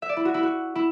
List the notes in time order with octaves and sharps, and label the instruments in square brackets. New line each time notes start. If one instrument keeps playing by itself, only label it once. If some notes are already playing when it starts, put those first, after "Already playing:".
[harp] E5
D5
E4
F#4
E4
F#4
E4